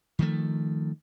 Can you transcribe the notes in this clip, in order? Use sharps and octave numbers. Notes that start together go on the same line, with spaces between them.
D#3 F3 A3